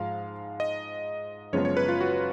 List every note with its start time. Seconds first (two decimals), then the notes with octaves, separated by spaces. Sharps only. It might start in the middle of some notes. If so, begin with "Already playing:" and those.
Already playing: G#2 F3 G#3 F5
0.60 D#5
1.53 F#1 F#2 F3 G#3 B3 C#5
1.65 C#5
1.77 B4
1.89 F4
2.01 F#4